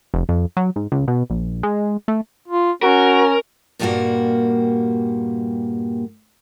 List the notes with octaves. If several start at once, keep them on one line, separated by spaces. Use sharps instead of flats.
F1
F2
F#3
G#2
C#2
B2
A#1
G#3
A3
F4
C#4 F#4 A#4
G2 A#2 G3 G#3 A#3 F#4